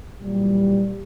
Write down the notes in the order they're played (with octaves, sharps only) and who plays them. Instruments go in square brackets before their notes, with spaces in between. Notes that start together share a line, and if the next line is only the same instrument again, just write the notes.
[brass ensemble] A#2 E3 F#3 G3